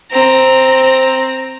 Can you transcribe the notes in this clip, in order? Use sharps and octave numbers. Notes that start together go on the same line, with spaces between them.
C4 A#5